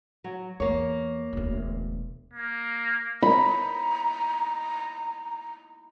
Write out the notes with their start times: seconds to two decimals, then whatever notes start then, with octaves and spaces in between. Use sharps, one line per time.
0.24 F#3
0.60 E2 A#3 C#5
1.33 E1 D2
2.33 A#3
3.23 A#5 B5